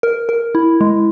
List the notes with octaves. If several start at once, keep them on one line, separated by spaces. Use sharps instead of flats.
A#4
A#4
E4
G#3